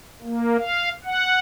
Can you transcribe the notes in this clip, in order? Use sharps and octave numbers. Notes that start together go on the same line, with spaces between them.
A#3
F5
F#5